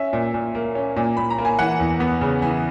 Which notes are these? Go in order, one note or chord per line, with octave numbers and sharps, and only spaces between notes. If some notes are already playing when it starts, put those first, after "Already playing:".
Already playing: C#4 E5
A#2
A#2
A#3
C#4
A#2
A#2 B5
A#5
A#3
G#5
E3 F#5
E2
B3
C#3
E3